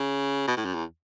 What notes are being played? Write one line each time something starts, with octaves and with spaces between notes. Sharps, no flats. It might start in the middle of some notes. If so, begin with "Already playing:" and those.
Already playing: C#3
B2
A2
F#2
E2